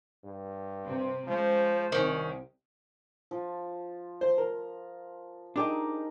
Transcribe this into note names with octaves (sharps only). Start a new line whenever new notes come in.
G2
C3 C4
F3 G#3 C#4 C5
C2 C3 D#3 C#4
F3
C5
A#4
D4 D#4 G4 G#4 A#4